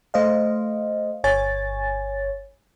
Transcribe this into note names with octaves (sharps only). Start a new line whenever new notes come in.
A3 C5 D#5 F5
G1 C#5 G#5 A6